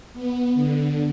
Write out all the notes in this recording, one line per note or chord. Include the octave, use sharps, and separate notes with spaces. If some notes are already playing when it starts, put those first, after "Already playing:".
B3
D3